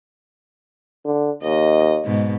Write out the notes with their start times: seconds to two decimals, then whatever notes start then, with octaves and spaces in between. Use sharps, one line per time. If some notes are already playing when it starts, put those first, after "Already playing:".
1.05 D3
1.43 D#2 D#5
2.05 G#2 B2